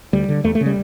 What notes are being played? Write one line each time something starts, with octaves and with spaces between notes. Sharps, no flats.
D2 G3
D3
E2 A3
A3
C#3
G3